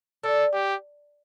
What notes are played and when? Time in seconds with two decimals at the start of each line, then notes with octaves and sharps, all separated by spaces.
0.24 D4 A4
0.54 G4